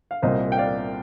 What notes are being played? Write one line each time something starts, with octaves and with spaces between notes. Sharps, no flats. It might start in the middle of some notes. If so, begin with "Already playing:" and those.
F5
C2 A#2 G3 C5 D#5
G5
D5 F5